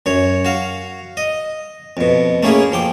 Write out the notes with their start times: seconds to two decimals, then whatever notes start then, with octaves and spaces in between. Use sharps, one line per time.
0.06 F#2 C#5
0.45 F#4 F5
1.17 D#5
1.97 F2 B2
2.43 A3 A#3 C#4 E4 G#4
2.72 F3 G5 D6